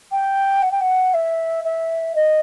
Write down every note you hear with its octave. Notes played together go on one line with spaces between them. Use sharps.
G5
F#5
G5
F#5
E5
E5
D#5